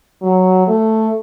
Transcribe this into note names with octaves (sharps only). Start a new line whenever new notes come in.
F#3
A3